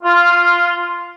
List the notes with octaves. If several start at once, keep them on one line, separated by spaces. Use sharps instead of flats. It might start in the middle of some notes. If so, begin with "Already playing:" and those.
F4